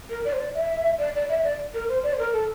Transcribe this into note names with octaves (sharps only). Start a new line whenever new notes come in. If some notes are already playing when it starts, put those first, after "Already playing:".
A#4
D5
C5
D5
E5
D5
D5
E5
D5
A#4
C5
D5
C5
A#4
A4